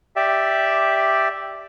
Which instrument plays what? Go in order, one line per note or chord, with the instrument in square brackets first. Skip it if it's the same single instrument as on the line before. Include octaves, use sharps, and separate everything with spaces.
[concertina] G4 D5 E5